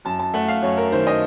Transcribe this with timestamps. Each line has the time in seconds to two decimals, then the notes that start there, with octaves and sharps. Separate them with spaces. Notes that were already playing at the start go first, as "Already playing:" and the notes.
0.05 F#2 A5
0.19 A5
0.34 A3 F#5
0.48 F5
0.62 F#2 C#5
0.77 A#4
0.92 D#3 C5
1.07 D#5